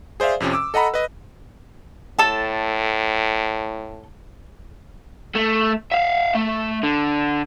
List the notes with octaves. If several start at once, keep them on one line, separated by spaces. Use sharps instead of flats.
G#4 C5 D5 E5 F5
F2 C3 F3 C#4
D6 E6
A4 D#5 F#5 A#5 B5
B4 D#5
A2 A4 A5
A3
E5 F5
A3
D3